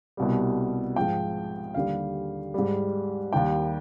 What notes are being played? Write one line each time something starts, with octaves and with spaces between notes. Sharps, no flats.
C2 B2 G3
G#2 F3 G5
D#2 D3 G3 F5
G#2 G3
D#2 D#3 G3 G5